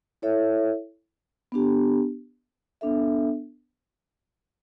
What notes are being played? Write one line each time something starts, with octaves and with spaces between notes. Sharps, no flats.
E4 A4 C#5 E5
B3 D4 G4
B3 D4 A4 E5